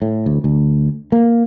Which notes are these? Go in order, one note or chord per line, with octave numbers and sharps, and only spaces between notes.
A2
D2
D2
A#3